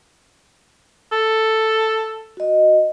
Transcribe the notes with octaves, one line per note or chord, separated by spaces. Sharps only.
A4
F#4 D#5